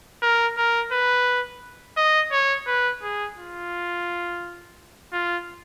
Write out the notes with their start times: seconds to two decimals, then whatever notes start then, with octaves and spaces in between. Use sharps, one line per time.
0.22 A#4
0.58 A#4
0.92 B4
1.97 D#5
2.32 C#5
2.67 B4
3.03 G#4
3.38 F4
5.13 F4